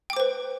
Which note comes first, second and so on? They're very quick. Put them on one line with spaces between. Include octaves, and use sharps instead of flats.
G5 D6 C5 B4